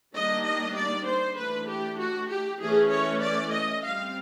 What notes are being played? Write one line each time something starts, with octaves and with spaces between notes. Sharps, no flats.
D#3 G3 A#3 D4 D#5
D#5
D5
C5
E3 A3 D4 B4
G4
F#4
G4
E3 A3 C#4 G#4
C#5
D5
D#5
G3 C4 F5